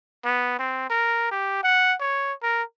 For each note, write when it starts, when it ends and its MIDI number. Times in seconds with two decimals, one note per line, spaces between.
0.25 0.58 59
0.59 0.86 60
0.90 1.30 70
1.31 1.63 67
1.63 1.94 78
2.00 2.33 73
2.43 2.63 70